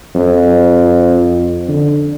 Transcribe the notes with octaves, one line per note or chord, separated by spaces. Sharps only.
F2
D3